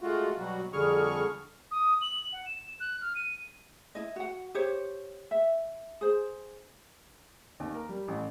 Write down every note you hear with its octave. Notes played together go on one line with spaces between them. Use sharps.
G#3 A3 F4 F#4
B2 F#3 G3 F#4
F2 D3 G3 G#4 C#6 F6
D#6
F#7
F#5
E7
F#6
F6
D#7
E4 D#5
F#4 F#5
G4 C5 C#5
E5
G#4 C5
D#2
A#4
G3
A1